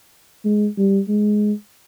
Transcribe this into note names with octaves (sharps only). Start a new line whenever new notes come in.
G#3
G3
G#3